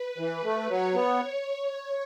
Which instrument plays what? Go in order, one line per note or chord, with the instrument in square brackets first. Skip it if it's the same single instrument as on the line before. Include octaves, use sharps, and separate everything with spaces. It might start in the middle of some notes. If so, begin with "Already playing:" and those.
Already playing: [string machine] B4
[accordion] E3
A3
[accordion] F#3 [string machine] C#5
[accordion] B3